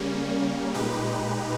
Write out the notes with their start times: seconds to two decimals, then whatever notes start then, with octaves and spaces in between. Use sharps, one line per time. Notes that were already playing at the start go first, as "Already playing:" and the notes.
Already playing: C#3 G3 A#3 C#4
0.74 A#2 G#3 D#4 G4 B4